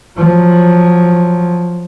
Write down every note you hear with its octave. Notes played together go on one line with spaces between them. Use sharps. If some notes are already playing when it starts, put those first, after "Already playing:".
F3 F#3